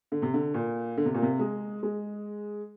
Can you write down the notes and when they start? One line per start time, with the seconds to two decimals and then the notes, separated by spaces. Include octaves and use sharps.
0.12 D3
0.22 C3
0.34 D3
0.54 A#2
0.97 D3
1.05 C3
1.14 A#2
1.22 C3
1.39 G#3
1.83 G#3